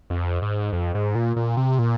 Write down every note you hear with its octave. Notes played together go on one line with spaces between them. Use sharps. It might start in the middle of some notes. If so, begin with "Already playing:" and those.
F2
G#2
F2
G#2
A#2
A#2
C3
A#2